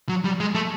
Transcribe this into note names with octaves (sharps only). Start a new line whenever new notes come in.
F#3
G3
G#3
A3